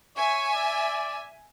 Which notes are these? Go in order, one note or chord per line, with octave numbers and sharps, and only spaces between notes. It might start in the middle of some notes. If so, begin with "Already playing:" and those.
C#5 E5 G#5
D5